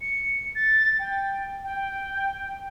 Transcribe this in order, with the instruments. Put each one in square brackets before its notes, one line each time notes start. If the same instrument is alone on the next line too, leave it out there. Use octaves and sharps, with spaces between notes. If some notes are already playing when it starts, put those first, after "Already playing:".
[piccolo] C#7
A6
G5
G5